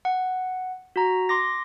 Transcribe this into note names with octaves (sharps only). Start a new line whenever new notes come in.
F#5
F#4 A#5
C6 D6 A#6